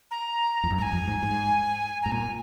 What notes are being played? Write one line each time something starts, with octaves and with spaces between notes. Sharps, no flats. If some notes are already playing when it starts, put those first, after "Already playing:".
A#5
F2
F#2
G#2 A#5
G#5
F2
G#2
G#2
G#2 A#5
A#2 G#5